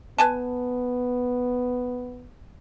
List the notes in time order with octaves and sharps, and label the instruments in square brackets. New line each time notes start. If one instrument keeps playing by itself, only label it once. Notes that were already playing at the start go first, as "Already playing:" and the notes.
[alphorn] B3 [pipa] B4 G#5 A5